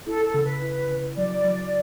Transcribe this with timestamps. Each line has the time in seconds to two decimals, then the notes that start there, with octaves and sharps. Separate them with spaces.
0.07 E4 A4
0.26 A4
0.34 C#3
0.44 B4
0.62 E4
0.90 C#3
1.17 F#3 D5
1.44 F#3